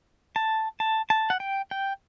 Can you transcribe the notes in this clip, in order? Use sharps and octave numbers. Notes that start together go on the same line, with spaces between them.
A5
A5
A5
F#5
G5
G5